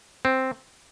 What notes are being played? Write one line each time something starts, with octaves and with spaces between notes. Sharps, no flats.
C4